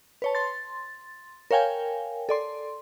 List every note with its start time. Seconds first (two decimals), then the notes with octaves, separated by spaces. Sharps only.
0.22 B4 C#5 A5
0.35 C6 A6
1.51 A#4 C#5 F5 G5 G#5
2.29 A4 D5 C6